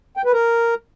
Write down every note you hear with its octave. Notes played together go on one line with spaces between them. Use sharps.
G5
B4
A#4